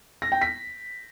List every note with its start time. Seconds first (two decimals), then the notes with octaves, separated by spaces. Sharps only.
0.22 A#6
0.32 G5
0.41 B6